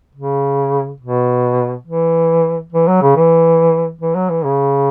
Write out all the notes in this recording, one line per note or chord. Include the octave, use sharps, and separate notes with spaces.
C#3
B2
E3
E3
F#3
C#3
E3
E3
F#3
E3
C#3